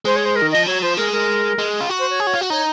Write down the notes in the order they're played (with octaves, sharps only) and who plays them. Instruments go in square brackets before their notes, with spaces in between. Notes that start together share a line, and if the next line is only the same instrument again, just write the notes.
[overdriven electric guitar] G#3 [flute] C5
[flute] C#5
C5
A#4
[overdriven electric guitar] D#3
[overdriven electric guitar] F3 [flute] D#5
[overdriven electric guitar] F#3 [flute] C#5
[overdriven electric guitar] F3 [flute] C5
[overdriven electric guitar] G#3 [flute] A#4
[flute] A#4
[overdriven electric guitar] G#3
F4
F#4
[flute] C5
C#5
[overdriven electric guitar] G#4
F#4
F4
F#4
[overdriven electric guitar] D#4 [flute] C#5